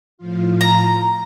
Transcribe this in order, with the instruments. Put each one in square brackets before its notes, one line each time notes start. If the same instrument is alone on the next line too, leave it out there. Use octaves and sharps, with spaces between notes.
[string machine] A2 F3 F4
[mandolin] A#5